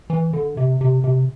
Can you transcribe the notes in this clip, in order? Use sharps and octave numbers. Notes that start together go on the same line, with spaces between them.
E3
D3
C3
C3
C3